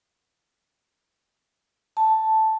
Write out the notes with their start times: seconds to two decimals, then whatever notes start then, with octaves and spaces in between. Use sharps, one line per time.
1.97 A5